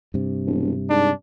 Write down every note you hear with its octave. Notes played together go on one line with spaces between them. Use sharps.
G2 C3
E1
G#2 D4